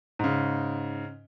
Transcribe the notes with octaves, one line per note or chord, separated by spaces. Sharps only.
G#2 C#3